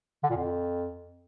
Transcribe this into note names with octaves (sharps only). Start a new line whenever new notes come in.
D3
A#2
F2